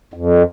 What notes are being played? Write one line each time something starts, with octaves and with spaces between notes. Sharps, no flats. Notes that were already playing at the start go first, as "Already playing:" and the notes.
F2